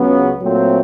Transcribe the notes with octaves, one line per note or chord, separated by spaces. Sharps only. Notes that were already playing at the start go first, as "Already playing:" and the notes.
Already playing: C#2 C#3 F#3 B3
A#2 F#3 A3 C4